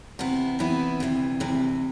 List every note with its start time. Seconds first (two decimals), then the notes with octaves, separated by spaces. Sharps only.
0.19 C3 E3 B3 E4
0.59 C3 E3 B3 E4
1.00 D2 C3 E3
1.40 D2 C3 E3